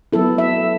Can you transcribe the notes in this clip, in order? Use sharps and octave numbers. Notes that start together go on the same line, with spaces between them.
F#3 B3 E4 A4
E5